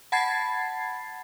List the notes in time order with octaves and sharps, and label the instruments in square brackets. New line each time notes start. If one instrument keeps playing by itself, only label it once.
[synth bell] F#5 A5 B5 G#6 A6 C7